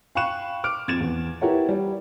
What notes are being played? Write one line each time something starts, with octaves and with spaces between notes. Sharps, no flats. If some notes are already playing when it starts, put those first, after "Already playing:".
F5 G5 B5 C#6 F#6 E7
D6 F6 D7
F2 G#6 A6 E7
E2
E4 G4 A#4 B4 C#5 F#5
G3